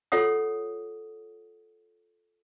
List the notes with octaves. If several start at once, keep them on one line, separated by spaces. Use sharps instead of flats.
F4 A4 C#5 F#5 D#6